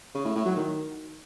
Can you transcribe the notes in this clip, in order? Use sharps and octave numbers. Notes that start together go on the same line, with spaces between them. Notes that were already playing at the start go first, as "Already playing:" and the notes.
C#3
A2
A2
F#3
D#3